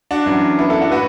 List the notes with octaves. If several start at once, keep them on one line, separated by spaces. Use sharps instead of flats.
D4 F#4
F#2 E3
B3 E4
E4 A4
D4 F#4
A2 F#4 B4